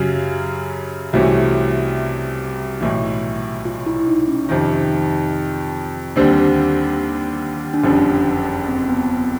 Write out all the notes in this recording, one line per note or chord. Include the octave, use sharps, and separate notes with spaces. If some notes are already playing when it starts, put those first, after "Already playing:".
Already playing: F#2 C#3 F#3 G4
C2 C3 E3 A3 C#4 F#4
B1 A2 E3
F4
E4
D#4
C#4
F2 C3 D#3 D#4
D#2 D3 G3 C4 D4
D4
F#1 F2 D3 G3 C#4
C4
B3
C4